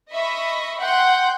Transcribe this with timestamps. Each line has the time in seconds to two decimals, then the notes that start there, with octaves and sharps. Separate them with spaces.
0.12 D#5 E5 B5 C#6
0.81 F#5 G5 C6 G6